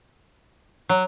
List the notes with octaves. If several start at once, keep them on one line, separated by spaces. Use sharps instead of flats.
F#3